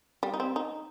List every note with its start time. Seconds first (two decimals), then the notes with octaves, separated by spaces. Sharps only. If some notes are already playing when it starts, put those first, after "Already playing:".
0.23 G3
0.34 D#4
0.40 C4
0.56 D#4